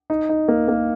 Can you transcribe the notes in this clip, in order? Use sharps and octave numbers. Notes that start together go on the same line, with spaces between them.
D#4
D#4
A#3
A#3